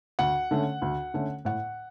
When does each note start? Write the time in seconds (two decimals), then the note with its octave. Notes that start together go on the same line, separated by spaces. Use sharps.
0.19 D2 F#5
0.51 D3 A3 C#4
0.82 D2
1.14 D3 A3 C#4
1.45 A2 F#5